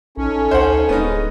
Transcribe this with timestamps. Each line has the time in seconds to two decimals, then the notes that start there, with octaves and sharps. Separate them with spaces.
0.17 A#1 C#4 D#4 A4
0.51 D2 C5 F#5
0.89 D1 G#3 B3 C#4 D#4